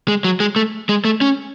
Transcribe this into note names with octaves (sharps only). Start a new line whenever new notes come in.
G#3
F#3
G#3
A3
G#3
A3
C#4